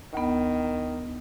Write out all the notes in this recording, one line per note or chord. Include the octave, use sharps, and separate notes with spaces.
D2 D#3 B3